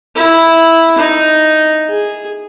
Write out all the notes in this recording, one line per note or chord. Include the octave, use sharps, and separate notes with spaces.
E4
D#4
G#4